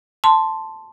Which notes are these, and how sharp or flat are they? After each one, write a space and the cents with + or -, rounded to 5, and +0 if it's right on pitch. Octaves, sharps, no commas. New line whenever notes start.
A5 +0 C6 +0